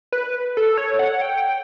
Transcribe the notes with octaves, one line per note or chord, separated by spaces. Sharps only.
B4
A4
C#5
F#5
G5